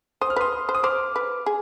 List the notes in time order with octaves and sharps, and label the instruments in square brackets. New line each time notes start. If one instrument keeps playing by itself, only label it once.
[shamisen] C5 [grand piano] D#6
[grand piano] F6
[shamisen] B4 [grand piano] C6 D#6
[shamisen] C5
[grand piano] D#6
[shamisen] C5 [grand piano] D6 F6
[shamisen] B4
G#4